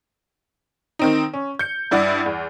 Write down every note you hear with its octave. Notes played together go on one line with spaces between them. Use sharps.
D#3 C4 D#4
C#4
G6 C#7
G2 E4 D5 F#5
E2